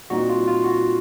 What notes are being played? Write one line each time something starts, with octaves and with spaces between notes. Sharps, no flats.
A#2 G3 C4 D#4 F#4
F4
F4
F#4